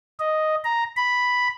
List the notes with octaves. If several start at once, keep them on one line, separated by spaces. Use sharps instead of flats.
D#5
A#5
B5